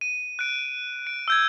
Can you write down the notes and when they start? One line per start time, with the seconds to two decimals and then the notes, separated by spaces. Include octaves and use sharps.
0.01 D#7
0.39 F#6 D7
1.07 D7
1.28 E6 G6 G#6